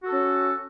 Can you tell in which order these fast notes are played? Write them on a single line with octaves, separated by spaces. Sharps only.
F#4 A4 C#4